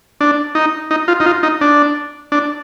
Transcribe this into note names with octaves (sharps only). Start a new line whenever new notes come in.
D4
D#4
D#4
F4
D#4
F4
D#4
D4
D4